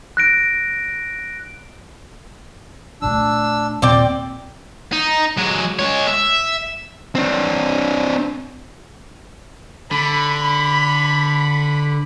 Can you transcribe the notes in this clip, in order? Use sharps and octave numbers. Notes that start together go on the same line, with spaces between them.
F#6 A#6 D7
A#2 A3 D4 E6
D#2 A#2 C4 D5 G5
D#4
F#3 G#3
G#3 C#5
E5
C4 D4
D3 B5